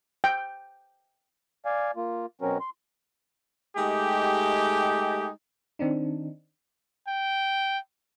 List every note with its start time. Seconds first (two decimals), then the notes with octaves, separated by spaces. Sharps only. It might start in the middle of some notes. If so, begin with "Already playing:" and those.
0.24 G5
1.65 D5 F5 G#5
1.96 A#3 F4
2.42 B2 F#3 C4 C#4 F#4 A#4
2.60 C6
3.77 G#3 A3 D#4 G4
5.79 D#3 C4 D4 D#4
7.08 G5